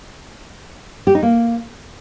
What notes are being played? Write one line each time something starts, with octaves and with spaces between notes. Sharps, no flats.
G4
D#4
A#3